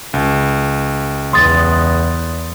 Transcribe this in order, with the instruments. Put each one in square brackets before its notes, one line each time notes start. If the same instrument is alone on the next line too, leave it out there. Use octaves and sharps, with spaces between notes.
[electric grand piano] C#2
[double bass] E2 [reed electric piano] C6 D#6 A6